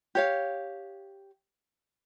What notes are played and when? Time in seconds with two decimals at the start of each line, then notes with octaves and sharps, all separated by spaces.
0.15 G4 C#5 F5